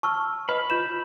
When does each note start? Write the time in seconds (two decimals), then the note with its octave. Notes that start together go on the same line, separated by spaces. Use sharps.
0.03 A5 C#6 E6 F6
0.49 B4 D#5 B5
0.70 F4 G6 E7